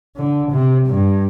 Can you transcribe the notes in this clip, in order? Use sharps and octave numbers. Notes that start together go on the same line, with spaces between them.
D3
C3
G2